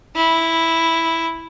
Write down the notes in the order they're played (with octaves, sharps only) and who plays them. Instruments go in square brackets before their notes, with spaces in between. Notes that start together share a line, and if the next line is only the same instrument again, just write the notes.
[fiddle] E4